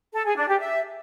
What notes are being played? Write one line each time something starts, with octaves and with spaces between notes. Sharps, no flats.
A4
G#4
D4
G4
E5